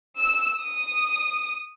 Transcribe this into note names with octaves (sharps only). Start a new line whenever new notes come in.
E6
D#6